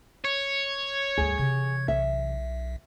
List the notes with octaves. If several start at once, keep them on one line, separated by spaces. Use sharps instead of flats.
C#5
D2 G2 G#4
C3 E3 G#6
B1 E5